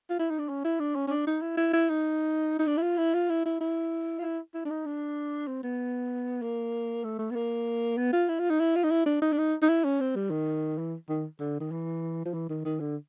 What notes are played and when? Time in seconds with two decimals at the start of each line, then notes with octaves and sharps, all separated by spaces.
0.10 F4
0.19 E4
0.30 D#4
0.39 D4
0.49 C#4
0.64 E4
0.80 D4
0.95 C#4
1.07 C#4
1.10 D4
1.27 D#4
1.42 E4
1.57 E4
1.73 E4
1.89 D#4
2.59 D#4
2.67 D4
2.77 E4
2.82 F4
2.98 E4
3.14 F4
3.30 E4
3.45 E4
3.61 E4
4.19 F4
4.22 E4
4.54 E4
4.65 D4
4.70 D#4
4.86 D4
5.47 C4
5.63 B3
6.42 A#3
7.04 A3
7.18 A3
7.30 B3
7.35 A#3
7.97 B3
8.13 F4
8.29 E4
8.39 F4
8.50 D#4
8.59 E4
8.75 F4
8.84 D#4
8.90 E4
9.06 D4
9.22 D#4
9.32 D4
9.38 D#4
9.62 D#4
9.69 E4
9.84 C#4
10.00 C4
10.15 G3
10.30 D#3
10.78 E3
11.09 D#3
11.39 D3
11.60 D#3
11.71 E3
12.25 F3
12.34 E3
12.49 D#3
12.65 D#3
12.80 D3